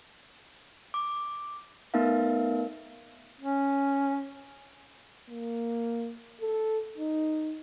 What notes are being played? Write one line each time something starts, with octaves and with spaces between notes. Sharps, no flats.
D6
A3 B3 D#4 A#4 E5 F5
C#4
A#3
A4
D#4